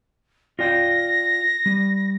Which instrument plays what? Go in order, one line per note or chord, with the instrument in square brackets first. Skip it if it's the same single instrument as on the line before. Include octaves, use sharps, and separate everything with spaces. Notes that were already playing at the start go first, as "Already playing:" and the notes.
[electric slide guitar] F4 D5 G5 [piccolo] A#6
[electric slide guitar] G3